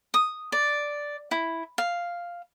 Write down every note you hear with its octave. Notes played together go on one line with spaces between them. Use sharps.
D#6
D5
E4
F5